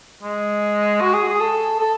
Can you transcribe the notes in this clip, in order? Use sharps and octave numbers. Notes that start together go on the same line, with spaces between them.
G#3
F#4
G#4
G#4
A4
A4